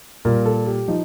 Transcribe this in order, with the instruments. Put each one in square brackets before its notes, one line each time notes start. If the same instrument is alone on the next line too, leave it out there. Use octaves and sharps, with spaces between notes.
[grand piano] A#2 G3 A#4
A4
G4
F3 D#4